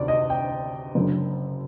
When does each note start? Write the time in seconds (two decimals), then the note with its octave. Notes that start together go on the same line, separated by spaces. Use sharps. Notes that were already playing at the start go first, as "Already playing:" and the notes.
Already playing: D2 C3 D#3 D5
0.08 D#5
0.30 G5
0.95 F#1 F#2 D3